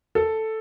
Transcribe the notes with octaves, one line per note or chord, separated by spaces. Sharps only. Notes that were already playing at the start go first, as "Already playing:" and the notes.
A4